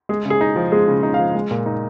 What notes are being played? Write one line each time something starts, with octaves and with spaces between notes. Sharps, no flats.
G#3 G#4
C#3
G#4
D#4
F3
G#3 G#4
C#3
D#4
F5
F3
G#3
A#2
D#4